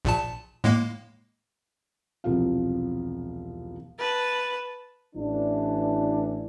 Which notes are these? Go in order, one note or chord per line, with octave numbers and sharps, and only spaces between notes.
A#1 A#2 A5
A2 G#3 A#3
E1 C2 F3 F5
B4 A5
A1 E3 D4